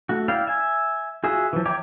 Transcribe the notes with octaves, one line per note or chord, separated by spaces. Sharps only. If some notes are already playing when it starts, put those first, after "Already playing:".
A3 F#4
E4 D5 F5 G5
E5 G#5
F4 F#4 G#4 E5
E3 F3
C#5 E5 G5 A#5 D6